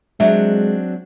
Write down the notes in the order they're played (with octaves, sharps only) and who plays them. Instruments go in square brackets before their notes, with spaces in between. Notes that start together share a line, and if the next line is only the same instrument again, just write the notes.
[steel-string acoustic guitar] F#3 C4 D4 [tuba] G#3 [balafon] E5